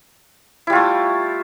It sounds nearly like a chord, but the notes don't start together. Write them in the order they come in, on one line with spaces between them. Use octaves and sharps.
E4 G3 F4 A3